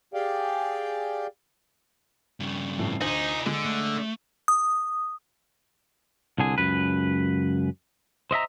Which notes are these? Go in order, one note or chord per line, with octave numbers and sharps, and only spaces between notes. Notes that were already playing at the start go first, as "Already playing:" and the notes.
G4 G#4 D5 F5 G5
G2 C#3
F2 A2 E3
D2 D#4 F4 C5 G#5 F#7
D3 G#3
A3
D#6
C2 D3 G#4
C#2 F#2 B4
C5 D#5 E5 A#5